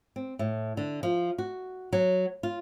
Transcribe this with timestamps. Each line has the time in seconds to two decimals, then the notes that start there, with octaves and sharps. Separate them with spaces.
0.16 C4
0.39 A2
0.77 D3
1.03 F3
1.38 F#4
1.93 F#3
2.43 F4